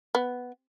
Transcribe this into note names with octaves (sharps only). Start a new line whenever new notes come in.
B3